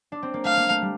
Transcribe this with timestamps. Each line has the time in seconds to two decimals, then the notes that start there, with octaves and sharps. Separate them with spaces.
0.12 D4
0.23 C4
0.34 A#3
0.45 A3 F5
0.57 A#3
0.70 A3
0.82 G3